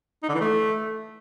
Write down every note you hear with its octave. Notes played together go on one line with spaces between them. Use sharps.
D#4
D3
E3
A3